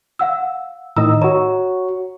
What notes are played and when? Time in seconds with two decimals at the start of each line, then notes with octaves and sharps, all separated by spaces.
0.19 F5 F#5 E6
0.97 A2 D#3 D#5 A#5 E6
1.22 F#4 C#5 A#5